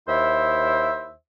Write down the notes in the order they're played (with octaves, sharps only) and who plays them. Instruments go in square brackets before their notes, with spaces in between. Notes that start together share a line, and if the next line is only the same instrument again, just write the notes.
[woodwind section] D#2 E4 C5 E5